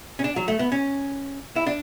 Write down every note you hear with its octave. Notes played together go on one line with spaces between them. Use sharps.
C#4
D4
F#3
A3
B3
C#4
E4
D4